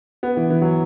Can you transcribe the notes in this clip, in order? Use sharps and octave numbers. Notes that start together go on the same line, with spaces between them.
B3
E3
E3
F#3